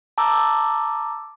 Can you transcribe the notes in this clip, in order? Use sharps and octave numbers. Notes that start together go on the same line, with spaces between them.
A5 A#5 D6 E6